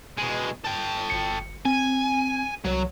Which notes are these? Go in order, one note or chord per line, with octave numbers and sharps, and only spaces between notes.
B2 G#3
A4 G5
G1 C#7
C4 G#5
C2 F#3 C#5